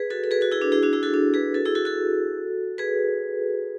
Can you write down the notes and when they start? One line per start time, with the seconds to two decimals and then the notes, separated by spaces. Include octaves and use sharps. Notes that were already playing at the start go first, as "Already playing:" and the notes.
Already playing: G#4 B4
0.10 F#4 A4
0.24 A4
0.31 G#4 B4
0.41 F#4 A4
0.52 E4 G#4
0.61 D4 F#4
0.72 E4 G#4
0.83 D4 F#4
0.93 E4 G#4
1.03 F#4 A4
1.14 D4 F#4
1.34 G#4 B4
1.54 F#4 A4
1.65 E4 G#4
1.75 F#4 A4
1.85 F#4 A4
2.78 G#4 B4